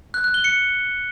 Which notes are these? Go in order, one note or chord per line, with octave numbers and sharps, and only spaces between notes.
F#6
F#6
G7
C#7